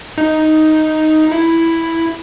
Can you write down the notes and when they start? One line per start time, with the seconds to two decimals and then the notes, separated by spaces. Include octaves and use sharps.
0.18 D#4
1.31 E4